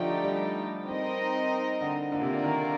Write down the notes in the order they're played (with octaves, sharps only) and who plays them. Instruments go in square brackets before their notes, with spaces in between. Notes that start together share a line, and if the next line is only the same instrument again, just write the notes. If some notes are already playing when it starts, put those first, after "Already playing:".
Already playing: [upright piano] D3 F3 [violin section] A3 D#4 G4 D5 G5
[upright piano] G3
[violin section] C4 D#4 A#4 D#5
[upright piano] D3
[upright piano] D3 [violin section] A#3 F4 A#4 D5
[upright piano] C3
D3
D#3